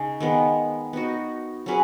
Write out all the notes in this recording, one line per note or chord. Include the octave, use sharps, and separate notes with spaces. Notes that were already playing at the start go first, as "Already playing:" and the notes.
Already playing: C#3 D#4
D#3 G#3 B3
B3 D#4 F#4
F#3 C#4 G#4 B4